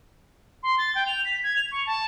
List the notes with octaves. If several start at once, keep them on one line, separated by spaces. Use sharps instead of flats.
C6
A6
G5
F7
B6
G#6
F7
C#6
A5